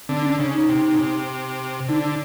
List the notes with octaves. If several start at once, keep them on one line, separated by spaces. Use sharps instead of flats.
D3 C4
D4
C#4
C#3 D4
D#4
C3
C#3
C3
D3 D#4
D4